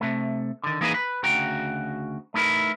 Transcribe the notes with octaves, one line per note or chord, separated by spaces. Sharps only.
C3 A3
D3 D#3
E3 A#3 D#4 G#4 B4 D#5
B4
D2 C#3 F#4 G5 A#5
A3 D#4 E4 A#4 B4